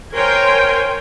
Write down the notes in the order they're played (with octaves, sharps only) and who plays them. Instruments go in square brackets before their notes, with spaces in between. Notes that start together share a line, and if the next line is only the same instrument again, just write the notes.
[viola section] A#4 C5 C#5 G5 G#5 C6